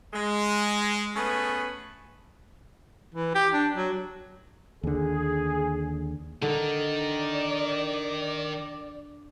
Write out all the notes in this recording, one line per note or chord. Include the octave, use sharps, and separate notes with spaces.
G#3
A3 B3 C#4 G#4 B4
E3
G4
D4
F#3
D#2 D3 G#4
D3 D#3 D#4 D5